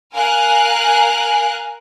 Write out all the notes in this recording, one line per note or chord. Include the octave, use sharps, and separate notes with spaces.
A#4 F5 G#5 F#6